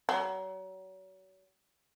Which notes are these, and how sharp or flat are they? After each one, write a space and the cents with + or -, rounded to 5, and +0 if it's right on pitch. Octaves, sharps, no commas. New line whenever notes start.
F#3 +35